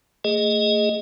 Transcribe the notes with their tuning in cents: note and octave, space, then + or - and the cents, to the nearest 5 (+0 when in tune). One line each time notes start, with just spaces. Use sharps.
A3 +35 G#4 -5 D#5 +0